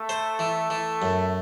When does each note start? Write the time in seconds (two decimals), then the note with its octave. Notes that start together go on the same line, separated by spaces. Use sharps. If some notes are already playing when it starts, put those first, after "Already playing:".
Already playing: A3
0.09 C5
0.39 E3
0.70 E3
1.02 F#2